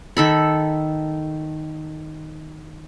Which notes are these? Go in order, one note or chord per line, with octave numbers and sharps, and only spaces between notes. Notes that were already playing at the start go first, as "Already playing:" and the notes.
D#3 A4 B5